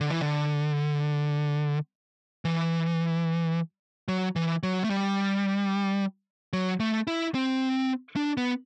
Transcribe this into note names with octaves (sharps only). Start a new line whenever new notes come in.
D3
E3
D3
E3
F#3
E3
F#3
A3
G3
F#3
A3
E4
C4
D4
B3